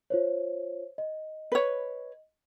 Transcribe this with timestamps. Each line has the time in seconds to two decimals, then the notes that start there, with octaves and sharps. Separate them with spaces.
0.10 F4 C5 C#5
0.98 D#5
1.52 B4 C#5